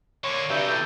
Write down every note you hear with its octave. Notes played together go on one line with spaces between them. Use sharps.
D3 A#3 C#5 C#6
G2 C3 F#3 E5 G5
E4 A4 G5